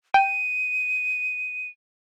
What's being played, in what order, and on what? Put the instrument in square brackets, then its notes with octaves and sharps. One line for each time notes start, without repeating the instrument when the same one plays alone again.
[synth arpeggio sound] G5 [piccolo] D#7